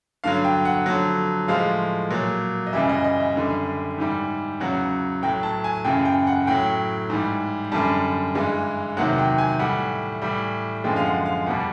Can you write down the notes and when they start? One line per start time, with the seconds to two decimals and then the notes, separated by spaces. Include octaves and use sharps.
0.24 G2 D3 F#3 F5
0.45 G5
0.65 F#5
0.86 F2 D3 F#3
1.48 A2 F3 G#3 F5
2.11 A#2 F#3
2.67 D#5
2.73 F#2 C#3 E3 G3 E5
2.89 D#5
3.04 D#5
3.20 E5
3.36 F#2 D3 G3
3.98 G#2 E3 G3
4.60 E2 C#3 F#3 F#5
5.23 A2 F#3 G5
5.43 A5
5.64 G#5
5.85 F#2 C#3 E3 G5
6.05 G5
6.27 F#5
6.47 A2 F#3 G5
7.10 G#2 E3 G3
7.72 F#2 D3 G3 A5
8.35 G2 E3 G#3
8.97 E2 C3 D#3 F#3 F#5
9.18 G5
9.38 G#5
9.59 A2 E3 G3 F#5
10.22 A2 E3 G3
10.84 F#2 D3 F3 G#3 G5
10.96 F5
11.05 F#5
11.26 F5
11.46 E2 B2 G3 F#5